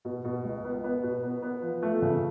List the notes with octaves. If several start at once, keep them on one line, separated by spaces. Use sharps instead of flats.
B2
B2
C#2
B3
B3
B2
B3
B3
F3
A3
C#3